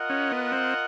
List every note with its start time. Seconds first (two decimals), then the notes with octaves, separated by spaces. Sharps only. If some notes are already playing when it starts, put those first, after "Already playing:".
Already playing: F4 A#4 D#5 F#5
0.10 C#4
0.31 B3
0.52 C4